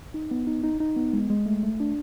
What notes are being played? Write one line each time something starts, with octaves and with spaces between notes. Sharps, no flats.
D#4
B3
D#4
D#4
D#4
B3
G#3
G#3
A3
A3
D4